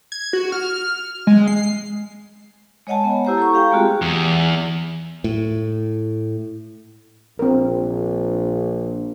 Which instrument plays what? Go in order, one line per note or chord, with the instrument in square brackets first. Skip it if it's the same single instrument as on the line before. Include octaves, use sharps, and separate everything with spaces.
[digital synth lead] G#6
F#4
F6
G#3
C7
[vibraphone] G#3 C#5 D#5 F#5 G#5 A5
B3
E4 G4 C5 F#5 A#5
A4 C#6
G4 F5 G5 A#5
G#3 A3 C4 F4 F#4 G#4
[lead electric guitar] E2
[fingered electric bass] A2
[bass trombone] A#1 [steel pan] C4 A#4